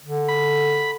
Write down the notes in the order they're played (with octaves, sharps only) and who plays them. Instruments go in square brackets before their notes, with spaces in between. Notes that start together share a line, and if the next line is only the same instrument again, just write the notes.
[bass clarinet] D3
[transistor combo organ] B5